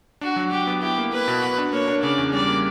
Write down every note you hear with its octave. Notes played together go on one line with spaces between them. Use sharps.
D4 F#4
F#3
F#3 G4
B3
E4 G4
A#3
A#3 B4
B2
F#4
D4
A#3 C#5
D4
C#3 D5
E2
G3 D5
A#3